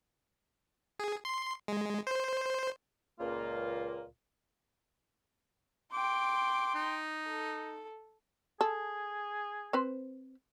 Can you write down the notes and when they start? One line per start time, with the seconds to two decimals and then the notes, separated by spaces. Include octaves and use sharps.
0.99 G#4
1.25 C6
1.68 G#3
2.07 C5
3.20 C#2 A#2 A#3 F4
5.93 G5 C6 D6
6.75 D#4
7.27 A4
8.61 G#4 A4
9.73 C4 B4 C5